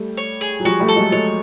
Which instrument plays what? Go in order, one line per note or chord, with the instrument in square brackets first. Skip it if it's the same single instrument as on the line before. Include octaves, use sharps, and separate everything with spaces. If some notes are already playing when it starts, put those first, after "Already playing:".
Already playing: [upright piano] G3 A3
[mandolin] C#5
G#4
[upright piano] F#3
[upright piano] F3 G3 [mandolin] F#4
[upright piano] G3 A3
[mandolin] A4
[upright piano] F#3 G#3
[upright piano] F#3 G#3 [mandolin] C#5